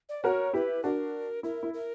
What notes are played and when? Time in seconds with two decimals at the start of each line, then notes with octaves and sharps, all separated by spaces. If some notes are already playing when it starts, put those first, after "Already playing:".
0.09 D5
0.23 F#4 A#4 C#5
0.53 E4 G4 B4
0.83 D4 F#4 A#4
1.43 E4 A#4
1.63 E4
1.73 A#4